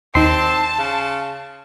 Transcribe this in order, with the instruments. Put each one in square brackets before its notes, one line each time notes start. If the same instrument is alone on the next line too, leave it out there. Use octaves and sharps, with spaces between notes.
[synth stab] D#2 D#4 [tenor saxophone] C4 [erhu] A5 [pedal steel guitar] C6
[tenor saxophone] C#3